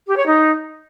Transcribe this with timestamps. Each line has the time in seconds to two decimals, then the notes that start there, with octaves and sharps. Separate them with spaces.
0.06 G4
0.16 C#5
0.26 D#4